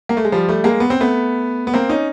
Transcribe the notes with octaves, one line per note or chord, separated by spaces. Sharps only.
A#3
A3
G#3
F3 G3
G3 A3
G#3 A#3
B3
C4
A3 B3
B3
A#3 C4
C#4 D#4